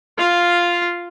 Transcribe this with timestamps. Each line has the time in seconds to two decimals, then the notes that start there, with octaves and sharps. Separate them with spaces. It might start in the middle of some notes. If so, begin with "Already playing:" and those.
0.18 F4 F5